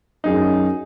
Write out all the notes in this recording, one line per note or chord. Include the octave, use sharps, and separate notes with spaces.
F#2 D#4 G#4